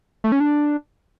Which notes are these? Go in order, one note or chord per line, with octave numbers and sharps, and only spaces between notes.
A3
C#4
D4